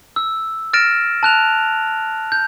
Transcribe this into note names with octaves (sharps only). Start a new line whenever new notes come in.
E6
F6 A6 A#6 D7 E7
A5 F#6 F7
G6